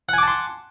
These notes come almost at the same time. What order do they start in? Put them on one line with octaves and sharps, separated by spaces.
F#5 G#5 D6 A5 C6